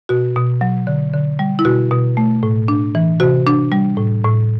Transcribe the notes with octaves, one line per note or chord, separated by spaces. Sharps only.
B2 F#4
B2
F#3
D3
D3
G3
E4
B2 F#4
B2
A3
A2
D4
E3
C3 F#4
D4
G3
A2
A2